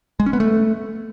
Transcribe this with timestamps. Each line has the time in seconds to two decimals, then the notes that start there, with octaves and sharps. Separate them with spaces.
0.20 G#3
0.26 C#4
0.33 B3
0.40 A3